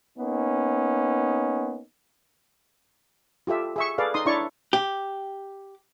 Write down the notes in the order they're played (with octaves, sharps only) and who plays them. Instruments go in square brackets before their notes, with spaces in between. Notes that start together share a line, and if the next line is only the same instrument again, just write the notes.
[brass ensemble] A#3 B3 C#4 D#4
[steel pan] F4 G4 A4 E5
G#4 E5 C#6
G#4 A4 B4 D5 F5
D#4 C6 D#6
D4 E4 C#5 D5 C#6
[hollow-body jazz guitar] G4